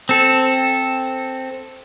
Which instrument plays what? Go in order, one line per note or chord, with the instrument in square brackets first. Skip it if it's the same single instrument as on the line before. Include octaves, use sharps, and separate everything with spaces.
[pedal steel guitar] C4 A4